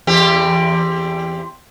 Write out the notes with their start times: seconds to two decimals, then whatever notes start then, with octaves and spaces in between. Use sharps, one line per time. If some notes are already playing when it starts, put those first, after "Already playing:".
0.07 E2 C4 G4